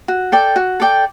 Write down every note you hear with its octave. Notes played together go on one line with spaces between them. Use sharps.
F#4
A4 D5 G5
F#4
A4 D5 G5